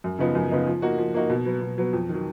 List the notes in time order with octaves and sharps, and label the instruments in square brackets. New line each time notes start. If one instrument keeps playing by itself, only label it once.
[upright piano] F#2
C#3 F3 B3 D#4
F#2
C#3 F3 B3 D#4
F3
A#3 D#4 F#4
F3
A#3 D#4 F#4
B2
F#3 B3
B2
F#3 B3
F2
D#3 F#3